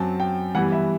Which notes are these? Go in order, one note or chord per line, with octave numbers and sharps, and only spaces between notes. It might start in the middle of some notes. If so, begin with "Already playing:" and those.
Already playing: F#2 F#3 C4 A5
G5
G2 E3 G3 B3 F#5
E5